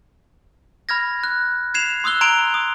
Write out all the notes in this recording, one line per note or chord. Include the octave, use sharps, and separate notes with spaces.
B5 F6 G#6 A#6
F#6
G#6 C7 E7 F7
C6 D#6 E6 F#6 G7
A#5 C6 G#6 D7 F7
D#6